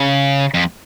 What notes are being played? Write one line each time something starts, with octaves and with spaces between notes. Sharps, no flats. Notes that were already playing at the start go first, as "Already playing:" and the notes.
Already playing: C#3
F2